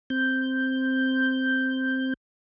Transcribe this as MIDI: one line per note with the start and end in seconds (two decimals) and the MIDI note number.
0.10 2.14 60
0.10 2.14 91